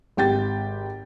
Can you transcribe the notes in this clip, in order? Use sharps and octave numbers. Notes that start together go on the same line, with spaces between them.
G#1 G4 G5 A6